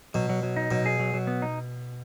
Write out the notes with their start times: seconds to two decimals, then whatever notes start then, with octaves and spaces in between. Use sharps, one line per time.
0.14 B2 F#3
0.29 F#3
0.43 F#3
0.56 D#4
0.71 B2 F#3
0.86 G#4
1.00 F#3
1.14 F#3
1.27 B3
1.42 D#4